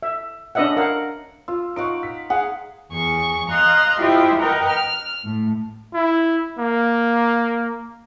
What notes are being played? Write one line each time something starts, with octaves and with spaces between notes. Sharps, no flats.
E5
C#4 D4 B4 D#5 E5 F#5
A#4 F5 F#5
F4 E6
D#4 F5 F#5 C#6 D7
B6
G#4 F5 F#5
E2 G#4 C#6
D#5 F5 A#5 C6 F#6
E4 F4 G4 C5 D#5 G5
A#4 B4 D#5 F#5 G5 A#5
F6
A2
E4
A#3